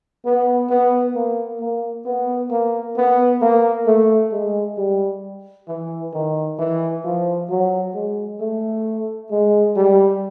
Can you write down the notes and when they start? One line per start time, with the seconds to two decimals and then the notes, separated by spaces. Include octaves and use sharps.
0.25 B3
0.70 B3
1.15 A#3
1.60 A#3
2.06 B3
2.51 A#3
2.97 B3
3.41 A#3
3.87 A3
4.32 G#3
4.77 G3
5.68 E3
6.14 D#3
6.59 E3
7.04 F3
7.49 F#3
7.94 G#3
8.40 A3
9.31 G#3
9.76 G3